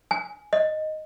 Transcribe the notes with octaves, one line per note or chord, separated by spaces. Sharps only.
G#5
D#5